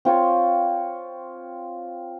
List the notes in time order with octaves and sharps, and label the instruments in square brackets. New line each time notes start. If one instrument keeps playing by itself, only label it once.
[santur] C4 F4 C#5